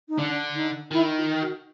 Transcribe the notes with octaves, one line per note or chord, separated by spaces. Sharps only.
D#4
D3 D4
D#4
D#3 E4
F4
F#4